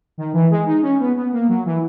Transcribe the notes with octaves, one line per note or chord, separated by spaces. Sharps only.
D#3
E3
G#3
D#4
C#4
B3
B3
A#3
F#3
E3